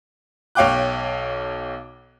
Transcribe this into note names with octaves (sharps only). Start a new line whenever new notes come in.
B1 C#5 F5 G5 D6 F#6